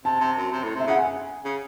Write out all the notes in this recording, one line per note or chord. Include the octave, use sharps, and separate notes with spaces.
C3 A5
C3
F#2
C3
A2
C3
E5
C#3 F#5
G#5
C#3